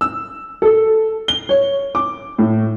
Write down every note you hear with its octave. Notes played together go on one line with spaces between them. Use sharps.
E6
A4
G7
C#5
D6
A2